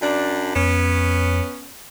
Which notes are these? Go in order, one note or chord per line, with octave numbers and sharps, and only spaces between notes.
F#2 D4
F2 B3 C#4